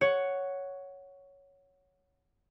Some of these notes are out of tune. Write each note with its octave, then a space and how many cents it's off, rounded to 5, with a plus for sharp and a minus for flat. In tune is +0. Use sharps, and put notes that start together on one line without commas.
C#5 +5 F#5 +0